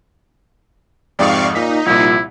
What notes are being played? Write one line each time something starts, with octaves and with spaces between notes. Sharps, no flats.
F2 G#2 C3 D5 F5 C#6 D#6
A#2 D#4 B6
C2 A#2 F3 E4